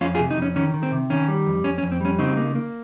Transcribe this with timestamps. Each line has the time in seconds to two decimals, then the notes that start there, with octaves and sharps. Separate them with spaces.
0.01 F2 C#4 F4
0.15 F4 G#4
0.20 C3
0.31 D#4
0.37 F2 C#4
0.56 D#3 C#4
0.74 D#3
0.83 C4
0.92 C3
1.10 D#3 C#4
1.28 G3
1.46 F2
1.64 F2 C#4
1.78 C#4
1.82 F2
1.92 C4
2.01 G3 C#4
2.19 C#3 C4 D#4
2.37 A#3
2.55 A#3